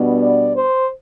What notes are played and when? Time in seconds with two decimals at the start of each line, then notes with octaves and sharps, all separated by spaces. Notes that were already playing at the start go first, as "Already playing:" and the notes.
Already playing: B2 G3 B3 D4
0.20 D5
0.56 C5